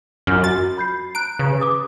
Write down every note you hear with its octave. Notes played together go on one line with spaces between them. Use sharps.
F#2 F4 F6
F#4 A6
B5 G6 C7
A#5 F#6 D7
C#3 B4
D6 D#6